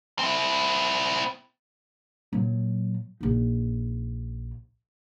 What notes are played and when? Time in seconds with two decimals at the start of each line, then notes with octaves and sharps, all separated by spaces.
0.19 C4 E4
2.33 A#2 F#3
3.21 A#1 D#4